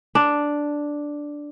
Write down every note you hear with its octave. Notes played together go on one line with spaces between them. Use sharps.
D4